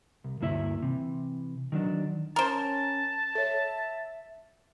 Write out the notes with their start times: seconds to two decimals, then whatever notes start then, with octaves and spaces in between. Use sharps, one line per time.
0.24 C2
0.41 D2 G2 A#3 E4 G4 E5
0.83 C3 E3
1.72 D#3 F#3 D4
2.36 C#4 A#4 C5 A5
3.35 A4 C#5 E5